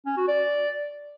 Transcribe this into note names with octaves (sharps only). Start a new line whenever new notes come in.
C#4
F#4
D5